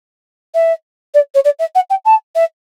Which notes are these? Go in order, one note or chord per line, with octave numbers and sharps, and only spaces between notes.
E5
D5
C#5
D5
E5
F#5
G5
A5
E5